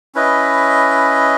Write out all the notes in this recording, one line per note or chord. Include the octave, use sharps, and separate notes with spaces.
C#4 E4 B4 D#5